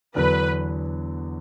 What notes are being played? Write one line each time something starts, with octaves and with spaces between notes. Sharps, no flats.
E2 D3 F#3 B3 D4 B4